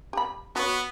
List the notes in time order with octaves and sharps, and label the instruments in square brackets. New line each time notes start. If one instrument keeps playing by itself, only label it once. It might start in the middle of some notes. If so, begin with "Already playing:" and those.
[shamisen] G4 B5
[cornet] B3 [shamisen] F#4 C#5